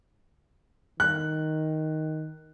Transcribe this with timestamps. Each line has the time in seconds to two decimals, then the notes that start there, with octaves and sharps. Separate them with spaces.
1.00 D#3 F#6